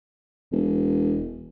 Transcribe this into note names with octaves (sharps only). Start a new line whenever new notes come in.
E1